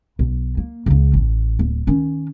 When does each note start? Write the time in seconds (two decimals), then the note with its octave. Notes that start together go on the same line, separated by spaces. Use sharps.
0.19 B1
0.57 A#3
0.86 C#2 C#3
1.14 A1
1.59 D1
1.87 D#3 C#4